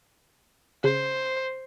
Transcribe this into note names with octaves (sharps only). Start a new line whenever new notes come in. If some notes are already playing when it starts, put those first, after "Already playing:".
C#3 C5